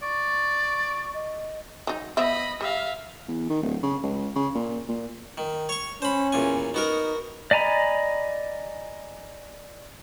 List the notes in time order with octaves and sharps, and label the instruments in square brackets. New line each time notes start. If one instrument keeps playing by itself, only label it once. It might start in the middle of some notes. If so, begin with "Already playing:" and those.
[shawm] D5 [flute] C#6
[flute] D#5
[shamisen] F#3 D#4
[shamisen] F3 B3 E5 [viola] D#5 B5
[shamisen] G3 [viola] E5 F5
[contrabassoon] E2
D#3
D1
C#3
C#2
C#3
A#2
A#2
[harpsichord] D#3
C#5 C#6
[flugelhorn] C#4 [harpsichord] C5 B5
[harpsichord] E2 A#2 G#5
[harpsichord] B3 F#4 A#4 [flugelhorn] D#4
[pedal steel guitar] D5 D#5 G#5 A#5 B5